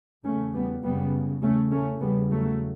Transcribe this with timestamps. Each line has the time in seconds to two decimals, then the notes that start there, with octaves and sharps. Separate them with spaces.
0.24 E2 C#3 A3 C#4
0.53 G3 B3
0.83 F#2 C#3 G3 B3
1.42 E2 C#3 A3 C#4
1.71 A3 C#4
2.00 E2 C#3 G3 B3
2.30 F#3 A3